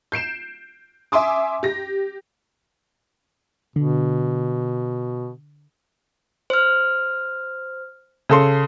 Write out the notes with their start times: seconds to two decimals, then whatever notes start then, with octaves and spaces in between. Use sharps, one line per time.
0.12 G6 C7 D7 E7
1.12 E5 G#5 C6 D6 D#6
1.63 G4 A#6
3.76 B2 D3
6.50 C5 F6
8.29 C#3 A4 C6